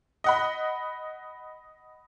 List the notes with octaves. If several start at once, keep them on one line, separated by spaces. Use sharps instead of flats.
D#5 F#5 B5